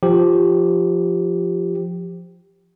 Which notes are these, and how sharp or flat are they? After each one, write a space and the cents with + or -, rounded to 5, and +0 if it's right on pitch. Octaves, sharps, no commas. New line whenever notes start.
F3 +0 G4 +0